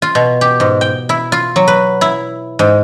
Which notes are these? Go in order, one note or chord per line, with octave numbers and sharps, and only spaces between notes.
F4
B2
G4
G#2
G5
E4
F4
F#3
B4
E4
G#2